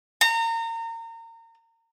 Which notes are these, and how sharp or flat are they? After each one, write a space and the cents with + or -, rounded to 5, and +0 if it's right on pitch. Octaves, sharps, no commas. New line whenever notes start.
A#5 -30